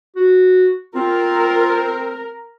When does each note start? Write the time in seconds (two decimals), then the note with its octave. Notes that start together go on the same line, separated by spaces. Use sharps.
0.16 F#4
0.95 C4 F4 A#4